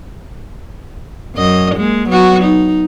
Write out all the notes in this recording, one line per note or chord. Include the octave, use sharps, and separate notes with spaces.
F#2 D#5
G#3 A#3
F#3 B3 F#4
D#4